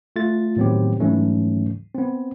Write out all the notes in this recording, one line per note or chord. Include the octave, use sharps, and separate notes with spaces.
A3 F4 A6
A2 D#3 F#3 B3 C4 G4
G#2 E3 F#3 A3 C#4
B3 C4